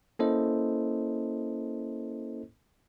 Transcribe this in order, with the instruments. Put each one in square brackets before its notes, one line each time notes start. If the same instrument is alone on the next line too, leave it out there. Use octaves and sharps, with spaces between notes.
[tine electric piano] A#3 C#4 E4 A4 C5 D#5